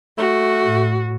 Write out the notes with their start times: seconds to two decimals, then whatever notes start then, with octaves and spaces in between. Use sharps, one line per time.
0.18 A3 F#4
0.64 A2